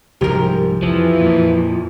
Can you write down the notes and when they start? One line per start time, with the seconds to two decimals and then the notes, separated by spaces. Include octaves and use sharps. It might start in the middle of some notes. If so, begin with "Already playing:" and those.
0.21 C2 G#2 F3 G4 A#4
0.83 F2 E3 F3
1.20 F2 A#2